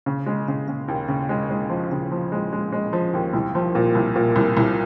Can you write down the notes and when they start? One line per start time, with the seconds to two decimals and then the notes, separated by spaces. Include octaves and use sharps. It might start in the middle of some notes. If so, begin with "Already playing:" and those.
0.06 C#3
0.26 G#3
0.48 C#3
0.68 C#3
0.88 D#2
1.08 C#3
1.29 G#3
1.50 G#3
1.70 F3
1.91 C#3
2.12 F3
2.32 G#3
2.53 G#3
2.72 G#3
2.93 F3
3.13 D#2
3.34 C2
3.55 F3
3.75 A#2
3.95 C2
4.16 A#2
4.36 C2
4.57 C2